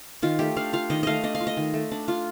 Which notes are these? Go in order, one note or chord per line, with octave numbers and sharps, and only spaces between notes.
D#3 F4
A3 G4
D4 F5
F4 F5
D#3 D#5
A3 D#5 F5
D4 D#5
F5
F4
D#5
D#3
A3
D4
F4